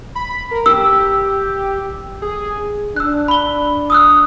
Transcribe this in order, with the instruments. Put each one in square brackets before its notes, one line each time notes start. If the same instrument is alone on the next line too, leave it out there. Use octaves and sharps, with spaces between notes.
[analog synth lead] B5
A#4
[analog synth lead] G4 [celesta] E6
[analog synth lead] G#4
[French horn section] D4 [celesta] E6 F#6
[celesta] B5 G7
D#6 E6 F#6